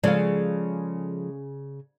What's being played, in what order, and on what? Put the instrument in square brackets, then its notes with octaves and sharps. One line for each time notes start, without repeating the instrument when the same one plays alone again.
[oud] C#3 [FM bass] F3 [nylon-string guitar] G#3 A4 F5 [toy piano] D5